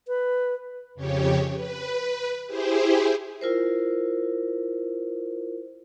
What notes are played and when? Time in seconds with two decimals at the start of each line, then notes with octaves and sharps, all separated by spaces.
0.08 B4
0.95 F2 C#3 G4 C#5
1.54 B4
2.47 E4 G4 G#4 C5
3.41 E4 F4 A#4 C5